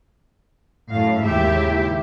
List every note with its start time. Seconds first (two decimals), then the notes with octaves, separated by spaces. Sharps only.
0.92 F#2 A2 F5
1.24 D#2 G#2 C#3 E4 G4 E5